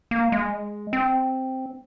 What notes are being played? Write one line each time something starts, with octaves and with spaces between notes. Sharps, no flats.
A#3
G#3
C4